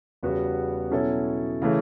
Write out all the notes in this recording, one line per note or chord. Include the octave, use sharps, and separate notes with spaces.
E2 C#3 G3 B3 F#4
B2 F#3 C#4 E4 A4
C#3 E3 A3